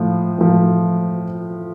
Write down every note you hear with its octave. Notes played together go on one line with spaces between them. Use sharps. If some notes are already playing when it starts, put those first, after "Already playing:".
Already playing: A2 F3
A2 F3